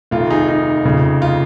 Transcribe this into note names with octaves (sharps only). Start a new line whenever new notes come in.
F1 F2 D#3 F4
D#4 G#4
D#4
F1 F2 C#3
F4